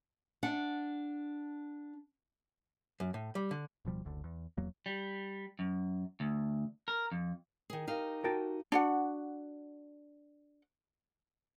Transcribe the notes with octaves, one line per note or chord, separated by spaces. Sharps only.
D4 F#5
F#2
A2
G3
D3
D1 B2 F3 G3
F#1 D2 D3
E2
D#1 E2 F#3 A#3
G3
F#2
D2
A#4
F2
D#3 G#4
D#4 G4 A#4 F5
F#4 A#4 G5 A5
D4 F#4 F#5